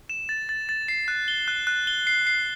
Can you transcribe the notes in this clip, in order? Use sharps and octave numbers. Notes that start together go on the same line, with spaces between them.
E7
A6
A6
A6
C7
F#6
G7
F#6
F#6
G7
C7
C7